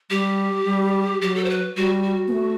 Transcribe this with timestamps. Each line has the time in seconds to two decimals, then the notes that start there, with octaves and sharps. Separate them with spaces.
0.10 G3 G4
0.66 G3
1.21 F#3 G4
1.36 A4
1.44 C5
1.50 B4
1.77 G3 F#4
2.03 F#4
2.28 B3
2.33 A3